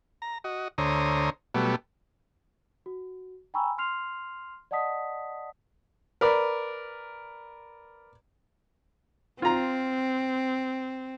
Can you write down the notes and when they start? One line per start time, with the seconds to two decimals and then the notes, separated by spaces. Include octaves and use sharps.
0.22 A#5
0.44 F#4 D#5
0.78 D2 D3 C5 C#5 A#5 D#6
1.54 B2 F#3 G3 A3 B3
2.86 F#4
3.54 G5 G#5 A#5 B5 C#6 E6
3.78 C6 F6 C7 F7
4.71 D5 D#5 F#5 A5 D#6 B6
6.21 A#4 B4 D5
9.42 C4 F4 A#5